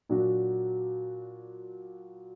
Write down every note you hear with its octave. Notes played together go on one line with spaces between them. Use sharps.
A#2 F#3 D4 F#4